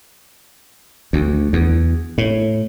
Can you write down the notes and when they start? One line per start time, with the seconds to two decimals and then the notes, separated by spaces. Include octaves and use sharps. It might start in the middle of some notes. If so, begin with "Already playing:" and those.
1.13 D2
1.53 E2
2.18 A2